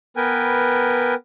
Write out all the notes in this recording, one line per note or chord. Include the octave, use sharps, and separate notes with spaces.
B3 A#4 B4 G5 G#5